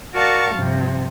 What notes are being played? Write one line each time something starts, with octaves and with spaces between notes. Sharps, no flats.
F#4 A#4 D5 F5 A5 C#6
G2 C3 F3